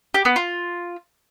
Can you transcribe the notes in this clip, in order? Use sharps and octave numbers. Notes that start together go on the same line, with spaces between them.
G4
B3
F4